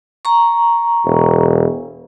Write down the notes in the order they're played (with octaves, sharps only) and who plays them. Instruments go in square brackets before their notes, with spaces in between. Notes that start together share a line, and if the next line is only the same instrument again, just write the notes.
[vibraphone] A#5 C#6
[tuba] E1